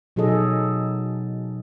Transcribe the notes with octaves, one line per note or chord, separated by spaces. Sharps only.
B2 F#3 D#4 G#4 A4 D#5